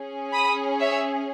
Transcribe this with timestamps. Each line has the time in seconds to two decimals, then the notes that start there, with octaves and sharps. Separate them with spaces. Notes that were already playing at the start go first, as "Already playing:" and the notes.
Already playing: C#4 G#4
0.33 B5 D#6
0.80 C#5 E5